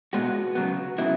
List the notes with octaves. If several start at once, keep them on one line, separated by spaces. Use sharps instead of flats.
B2 G#3 B3 F#4
C#3 F#3 B3
C#3 F#3 B3 E4